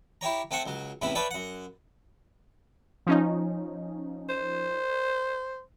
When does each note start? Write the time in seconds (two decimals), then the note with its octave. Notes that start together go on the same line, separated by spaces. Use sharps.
0.21 E4 G4 C#5 A#5
0.51 A3 C4 C5 F#5 C#6
0.66 C#2 F#3
1.02 E2 A2 C3 E3 C#4 B5
1.15 B4 C#5 D5 E5 G5 A5
1.31 F#2 F#5
3.07 F3 C#4 D#4
4.29 C5